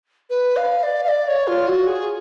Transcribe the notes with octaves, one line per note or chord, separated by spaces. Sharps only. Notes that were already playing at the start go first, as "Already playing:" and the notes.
B4
F5
D5
F5
D5
C#5
F4
F#4
G#4